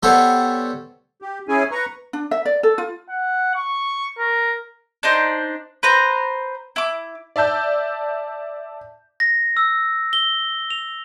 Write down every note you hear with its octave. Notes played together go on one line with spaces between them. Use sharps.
G3 B3 A4 C5 C#5
G4
C#4 E4 G#4 G#5
B4 A#5 C#6
D4
E5
D5
A4
F4
F#5
C#6
A#4
D4 D#4 C5
B4 C5 A#5
E4 D6
D5 E5 A5 G6
A#6
E6
G7
F7